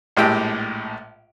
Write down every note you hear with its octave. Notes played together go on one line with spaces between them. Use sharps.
A#1 A2 G#3 G4 G5 E6